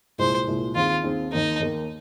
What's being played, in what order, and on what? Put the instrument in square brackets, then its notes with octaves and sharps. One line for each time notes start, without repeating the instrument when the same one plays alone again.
[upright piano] C2 A#2 G#3 [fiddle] C5
[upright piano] C2 A#2 G#3
[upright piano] D#2 D#3 C4 G#4 [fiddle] F4
[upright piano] D#2 D#3 C4 G#4
[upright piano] D#2 D#3 A#3 [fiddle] D#4
[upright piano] D#2 D#3 A#3